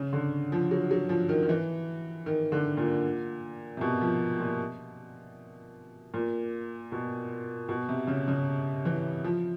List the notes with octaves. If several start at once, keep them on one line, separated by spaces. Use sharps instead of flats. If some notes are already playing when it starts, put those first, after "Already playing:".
Already playing: C#3
D3
F3
F#3
F#3
F3
D#3
D#3
E3
D#3
D3
A#2
C3
B2
F3
A#2
A#2
B2
B2
C3
C#3
C#3
E3
F3